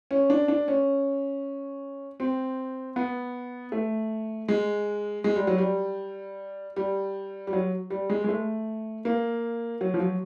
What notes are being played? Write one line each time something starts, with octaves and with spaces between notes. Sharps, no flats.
C#4
D4
D4
C#4
C4
B3
A3
G#3
G#3
G3
F#3
G3
G3
G3
F#3
G3
G#3
G#3
A3
A#3
F#3
F3
F#3